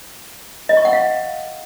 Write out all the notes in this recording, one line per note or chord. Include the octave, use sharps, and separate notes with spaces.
D#5
C#6
F#5
F5